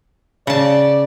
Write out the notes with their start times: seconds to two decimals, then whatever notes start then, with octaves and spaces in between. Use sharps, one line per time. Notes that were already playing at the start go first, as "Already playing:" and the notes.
0.47 C#3 D5 A5